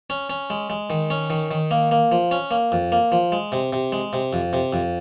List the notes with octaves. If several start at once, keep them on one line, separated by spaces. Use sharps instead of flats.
C#4
C#4
G#3
G#3
D#3
C#4
D#3
D#3
A#3
A#3
F3
C#4
A#3
F2
A#3
F3
G#3
C3
C3
G#3
C3
F2
C3
F2